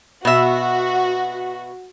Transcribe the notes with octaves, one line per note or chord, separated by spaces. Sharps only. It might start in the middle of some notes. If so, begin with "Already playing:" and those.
B2 F#4 E5